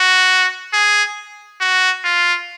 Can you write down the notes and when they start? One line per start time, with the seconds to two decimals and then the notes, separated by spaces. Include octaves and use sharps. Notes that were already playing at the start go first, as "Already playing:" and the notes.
Already playing: F#4
0.73 G#4
1.61 F#4
2.04 F4